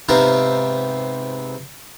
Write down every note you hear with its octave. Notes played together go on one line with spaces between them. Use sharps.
G#2 C3 B3 C4 D#4 F4